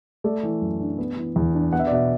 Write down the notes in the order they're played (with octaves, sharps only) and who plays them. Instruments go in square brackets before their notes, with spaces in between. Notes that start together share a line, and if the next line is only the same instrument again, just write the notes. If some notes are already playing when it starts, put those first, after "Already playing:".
[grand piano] A3 D5
E3
F#2
D4
B3
E3
E2
D4
B3 F#5
E5
D5
B2 E5